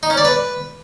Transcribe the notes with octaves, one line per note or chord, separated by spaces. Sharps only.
D#4
C#4
D5
B4